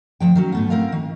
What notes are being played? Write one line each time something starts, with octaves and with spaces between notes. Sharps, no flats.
D2 G#2 F3 G5
D#3 F#3 C#4
G#2 A3 B3
C4 E4 A#4 F5
D#3